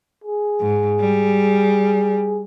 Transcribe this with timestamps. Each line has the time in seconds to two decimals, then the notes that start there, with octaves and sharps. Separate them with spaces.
0.24 G#4
0.60 G#2
1.00 G3